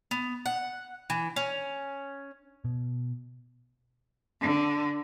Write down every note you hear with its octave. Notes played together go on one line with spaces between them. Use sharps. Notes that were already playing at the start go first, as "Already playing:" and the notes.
B3
F#5
E3
C#4
B2
D3